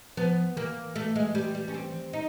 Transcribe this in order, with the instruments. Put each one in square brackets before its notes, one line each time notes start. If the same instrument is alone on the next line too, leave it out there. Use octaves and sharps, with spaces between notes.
[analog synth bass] F3 [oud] B3
[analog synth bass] E3 [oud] A#3
[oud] A3
G#3
G3
G3
C#4
C4
D#4